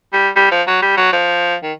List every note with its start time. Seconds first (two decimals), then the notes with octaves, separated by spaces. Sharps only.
0.13 G3
0.36 G3
0.52 F3
0.67 F#3
0.82 G3
0.97 F#3
1.13 F3
1.63 D#3